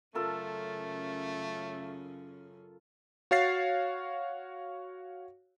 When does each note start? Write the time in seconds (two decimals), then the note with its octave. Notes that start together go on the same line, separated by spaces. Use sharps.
0.15 F#2 C#3 A3 C#4 F4 A4 A#4
3.31 F#4 C#5 F5 A6 C7